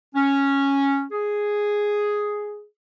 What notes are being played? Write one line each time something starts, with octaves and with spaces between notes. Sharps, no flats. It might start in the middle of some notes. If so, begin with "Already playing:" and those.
C#4
G#4